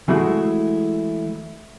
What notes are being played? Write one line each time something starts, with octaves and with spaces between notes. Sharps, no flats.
E3 G#3 A3 E4 F#4 G#4